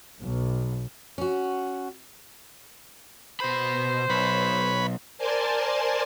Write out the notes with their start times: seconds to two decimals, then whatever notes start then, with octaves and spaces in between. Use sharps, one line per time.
0.20 B1
1.18 C#4 F#4
3.40 B2 C5 B5
4.10 B1 B4 C#5 B5
5.18 A#4 C5 D5 G#5 A5 C6